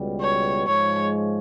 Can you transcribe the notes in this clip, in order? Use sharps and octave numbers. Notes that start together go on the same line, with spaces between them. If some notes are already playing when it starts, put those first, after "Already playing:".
Already playing: C#2 B2 G3
C#5
G#2 F3 G#3 C#5